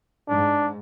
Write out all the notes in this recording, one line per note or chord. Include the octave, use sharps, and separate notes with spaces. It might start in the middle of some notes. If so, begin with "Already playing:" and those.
G#2 D4